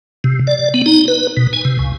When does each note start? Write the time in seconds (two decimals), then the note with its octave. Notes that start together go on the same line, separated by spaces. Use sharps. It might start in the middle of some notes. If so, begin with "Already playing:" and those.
0.24 C3
0.47 D5
0.74 B3
0.86 D#4
1.08 B4
1.37 B2
1.53 G#5
1.65 C3
1.79 C#2